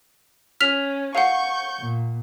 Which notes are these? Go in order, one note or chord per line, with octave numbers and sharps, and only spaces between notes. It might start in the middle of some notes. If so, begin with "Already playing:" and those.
C#4 F6 B6 F7
F5 F#5 C#6 G6
A#2